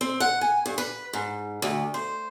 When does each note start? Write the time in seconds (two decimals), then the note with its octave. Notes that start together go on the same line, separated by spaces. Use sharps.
0.01 C4
0.20 F#5
0.41 G#5
0.66 G2
0.78 B4
1.13 G#2
1.62 D2
1.94 C5